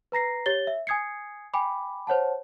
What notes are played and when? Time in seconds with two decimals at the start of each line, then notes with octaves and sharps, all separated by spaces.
0.12 B4 A#5 A#6 C7
0.46 G4 C#5 A6 G7
0.67 E5
0.87 G#5 D#6 G#6 C7 C#7
1.54 G5 G#5 B5 D6
2.07 C5 C#5 F#5 A5